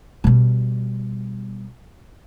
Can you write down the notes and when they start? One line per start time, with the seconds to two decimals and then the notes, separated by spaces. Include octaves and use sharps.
0.24 B2 G3